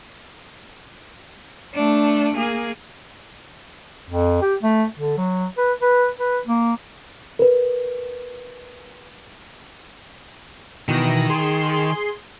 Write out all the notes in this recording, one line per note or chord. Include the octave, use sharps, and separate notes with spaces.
A3 D4
A#3 G#4
F2
G4
A3
D3
F#3
B4
B4
B4
A#3
A#4 B4
B2 D#3 E3 A#6
G#4 C6